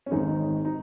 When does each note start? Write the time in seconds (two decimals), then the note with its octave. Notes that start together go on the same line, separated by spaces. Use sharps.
0.06 C#4
0.11 G#1 G#2 D#3 D#4
0.27 D#4
0.65 D#4